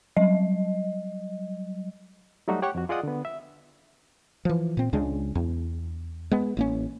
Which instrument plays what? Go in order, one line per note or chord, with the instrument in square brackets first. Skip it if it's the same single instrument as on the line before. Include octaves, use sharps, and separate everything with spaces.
[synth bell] F#3 G3 D#5
[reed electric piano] F#3 G3 A3 D#4 F#4 G4
G4 C#5 F#5 G5 C#6 F#6
F2 F#4
F4 G#4 D5 D#5 F#5 D#6
D3 B3
E5
[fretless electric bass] E3 F3
A#2 C4
C#2 C#3 G#3 D4
E2
G#3 B3
A1 A#3 C#4